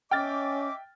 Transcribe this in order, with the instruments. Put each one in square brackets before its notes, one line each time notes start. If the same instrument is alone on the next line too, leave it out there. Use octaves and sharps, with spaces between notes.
[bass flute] C#4 [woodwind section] D#5 E5 D6 [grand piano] G5 F6 A6